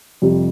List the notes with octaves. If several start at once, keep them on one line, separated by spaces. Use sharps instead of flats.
F2 C3 G3